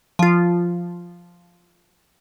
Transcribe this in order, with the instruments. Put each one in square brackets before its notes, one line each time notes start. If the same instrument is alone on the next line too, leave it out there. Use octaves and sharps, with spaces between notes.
[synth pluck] F3 F4